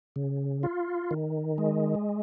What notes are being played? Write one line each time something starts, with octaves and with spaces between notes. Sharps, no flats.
C#3
F4
D#3
G#3